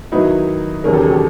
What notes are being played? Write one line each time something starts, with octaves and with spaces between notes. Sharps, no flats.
D#3 F#3 B3 D#4 E4 F#4
E1 D#2 C#3 F#3 G#4 A#4
G4 A4
F#4 G#4
G4 A4